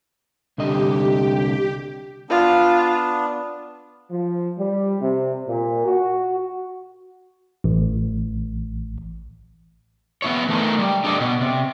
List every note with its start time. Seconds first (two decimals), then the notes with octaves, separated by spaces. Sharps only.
0.58 C2 D3 G4 D#5
2.30 B3 D4 F4
4.11 F3
4.58 G3
5.01 C3
5.48 A#2
5.85 F#4
7.64 A1
10.22 B3 E4 C#5
10.48 E3 A3 D#4 A#4
10.78 G3
11.04 D4 G4 A4 D5 D#5
11.20 B2
11.41 C3